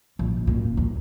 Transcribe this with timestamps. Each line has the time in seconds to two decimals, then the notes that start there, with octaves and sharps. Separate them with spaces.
0.19 A#1
0.47 D#1 A#2
0.77 D#2